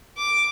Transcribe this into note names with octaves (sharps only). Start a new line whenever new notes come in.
D6